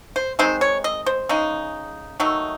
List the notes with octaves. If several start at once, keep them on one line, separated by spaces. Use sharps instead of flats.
C5
D#3 G#3 C4 D#4 C5
C#5
D#5
C5
C#3 G#3 D#4
D#3 F#3 A3 D#4